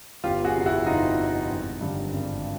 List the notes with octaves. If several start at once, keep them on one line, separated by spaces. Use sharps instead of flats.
G1 F4 G4
F#4 G#4
F2 C3
E4 F#4
G1 D#4 F4
F2 C3
G#1
G2 D3
G#1